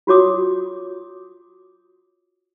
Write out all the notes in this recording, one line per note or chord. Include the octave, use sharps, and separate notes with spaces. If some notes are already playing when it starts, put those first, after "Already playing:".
F4 F#4 C#5 D6 D#6